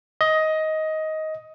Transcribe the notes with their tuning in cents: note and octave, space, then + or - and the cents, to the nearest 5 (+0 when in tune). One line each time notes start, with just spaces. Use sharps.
D#5 +15